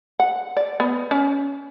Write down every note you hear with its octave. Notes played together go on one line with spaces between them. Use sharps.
F#5
D5
B3
C#4